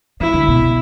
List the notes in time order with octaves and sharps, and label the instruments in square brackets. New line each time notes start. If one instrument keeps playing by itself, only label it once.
[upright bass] E3 [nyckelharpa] E4
[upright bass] D3
B2